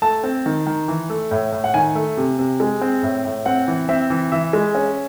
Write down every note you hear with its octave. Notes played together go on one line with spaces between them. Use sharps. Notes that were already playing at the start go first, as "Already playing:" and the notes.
A3 A5
C4
D#3
D#3
E3
A3
A2
A2
F#5
D#3 G#5
A3
C3
C3
G#3
C4
A2
A2
C4 F#5
E3
C4 E5
E3
E3 E5
G#3
C#4